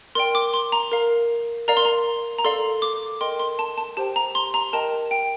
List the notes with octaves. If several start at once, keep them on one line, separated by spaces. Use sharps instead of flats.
A#4 D5 G5 C6
D6
C6
A#5
A#4 F5
A#4 D5 F5 A#5
C6
A#5
A#5
A4 D5 F5 C6
D6
A#4 D#5 G5 C6
C6
A5
A5
G4 C5 G5 A5
A#5
C6
A#5
A#4 D#5 G5 A5
G5